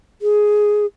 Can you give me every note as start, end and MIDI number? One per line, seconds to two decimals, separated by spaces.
0.22 0.86 68